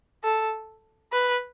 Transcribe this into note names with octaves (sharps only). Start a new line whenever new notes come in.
A4
B4